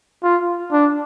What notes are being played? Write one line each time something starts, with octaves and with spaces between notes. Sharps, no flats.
F4
D4